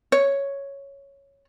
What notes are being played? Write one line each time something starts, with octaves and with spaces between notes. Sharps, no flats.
C#5